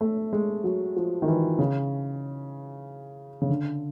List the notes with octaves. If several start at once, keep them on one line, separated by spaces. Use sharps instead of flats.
A3
G#3
F#3
F3
D#3
E3
C#3
C#3
D3